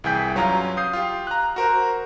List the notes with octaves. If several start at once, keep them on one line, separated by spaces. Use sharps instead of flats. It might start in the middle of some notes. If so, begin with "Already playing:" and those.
C2 E3 G#4 G5 G6 B6
G2 F#3 C#4 F4 A#5
D#6 G6 C7
F4 G4
A#5 F#6
F#4 A#4 C5